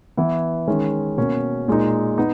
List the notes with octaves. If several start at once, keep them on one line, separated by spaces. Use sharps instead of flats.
E3 B3 E4
D#3 G#3 C#4
B2 A#3 C#4
A#2 G#3 D#4
B3 D#4